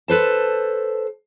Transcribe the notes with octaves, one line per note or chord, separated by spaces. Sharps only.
A4 B4 C5 A5